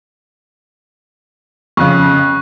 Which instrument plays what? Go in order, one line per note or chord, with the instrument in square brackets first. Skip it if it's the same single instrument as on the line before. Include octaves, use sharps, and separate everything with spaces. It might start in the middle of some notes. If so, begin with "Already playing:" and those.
[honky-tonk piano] F2 C#3 [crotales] C#6 F#6